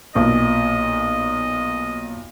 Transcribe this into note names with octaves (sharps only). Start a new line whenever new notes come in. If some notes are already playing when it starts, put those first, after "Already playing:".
B1 A#2 D#5